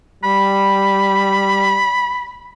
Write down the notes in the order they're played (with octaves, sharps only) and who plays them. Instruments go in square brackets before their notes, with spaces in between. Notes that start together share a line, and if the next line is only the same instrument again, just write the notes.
[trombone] G3 [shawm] B5